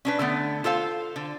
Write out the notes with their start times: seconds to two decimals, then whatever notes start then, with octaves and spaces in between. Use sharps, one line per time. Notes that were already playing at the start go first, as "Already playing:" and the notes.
0.05 C#4 D4 B4
0.19 D3 A3 B3
0.64 F4 A4 C5 F5
1.16 D3